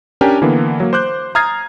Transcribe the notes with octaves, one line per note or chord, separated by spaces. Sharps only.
C#4 D4 G4 A#4 G#5
D3 E3 A#3 B3
F#3 A#3
C5 D6 F#6 G6
A#5 D#6 F6 G#6 A6 C7